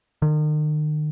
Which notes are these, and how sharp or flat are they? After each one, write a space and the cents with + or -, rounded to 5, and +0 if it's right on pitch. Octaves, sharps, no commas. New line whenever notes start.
D#3 -40